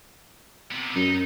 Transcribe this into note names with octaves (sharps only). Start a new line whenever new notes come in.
C3 B3
F#2 D#4